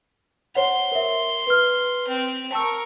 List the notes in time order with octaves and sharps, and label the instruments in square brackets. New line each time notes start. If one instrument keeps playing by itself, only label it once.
[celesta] C5 C#5 F#5 [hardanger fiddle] C6
[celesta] A#4 E5
B4 F6
[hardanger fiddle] C4
[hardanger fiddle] A#4 C#6 [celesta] A5 E6